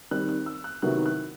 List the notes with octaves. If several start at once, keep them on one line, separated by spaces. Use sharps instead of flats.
D#3 G3 C4 F#6
F#6
E6
F#6
C3 D#3 F#3 B3 E4 F#6
F#6